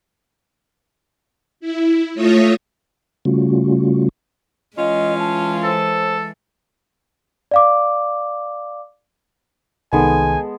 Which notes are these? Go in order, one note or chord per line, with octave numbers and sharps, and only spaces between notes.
E4
A3 F4 C#5 E5 D#6 A#6
C#3 G3 A3 C#4 F4 F#4
E3 G#3 C#4 F4 D#5
A5
A4 C5
D5 F5 D6
C2 D#3 G#3 B3 A4 G#5